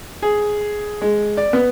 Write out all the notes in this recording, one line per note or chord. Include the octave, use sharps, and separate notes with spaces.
G#4
G#3
D5
B3